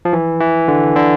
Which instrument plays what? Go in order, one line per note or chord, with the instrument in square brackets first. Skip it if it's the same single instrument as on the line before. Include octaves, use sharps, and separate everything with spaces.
[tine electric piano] F3
E3
E3
D3
D3